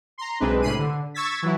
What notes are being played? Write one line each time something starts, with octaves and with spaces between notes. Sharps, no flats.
A#5 C6
B1 G#3 C4 D4 B4
A2 C3 B5 C7 D#7
D3
C#6 E6 G#6 A6 B6
E3 F#3 E4